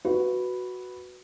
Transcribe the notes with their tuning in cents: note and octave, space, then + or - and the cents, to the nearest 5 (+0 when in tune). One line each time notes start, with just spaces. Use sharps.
F#4 +0 B4 +0